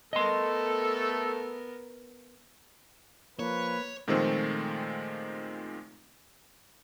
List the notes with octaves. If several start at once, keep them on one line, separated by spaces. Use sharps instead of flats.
A3 B3 A4 A#4 D#5 C6
F3 A#3 B4 C#5
A#2 D#3 F3 G#3 A3 C4